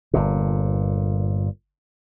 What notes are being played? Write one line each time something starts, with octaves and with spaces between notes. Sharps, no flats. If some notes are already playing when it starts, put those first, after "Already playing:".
G1 A#2